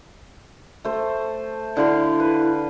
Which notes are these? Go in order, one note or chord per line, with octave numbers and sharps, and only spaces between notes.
A3 C5
D3 E4 F5 C6
B4